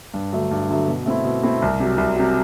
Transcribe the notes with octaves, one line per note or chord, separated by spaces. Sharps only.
G2
D3 F#3 A3
G2
D3 F#3 A3
B2
A3 C4 E4
B2
A3 C4 E4
C2
C3 F#3
C2
C3 F#3